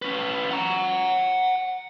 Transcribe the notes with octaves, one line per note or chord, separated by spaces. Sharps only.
C#4 B4
F#5 A#5